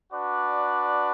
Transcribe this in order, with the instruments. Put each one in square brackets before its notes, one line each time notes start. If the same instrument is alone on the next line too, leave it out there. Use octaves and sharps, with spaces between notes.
[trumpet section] D4 F#4 B4 D5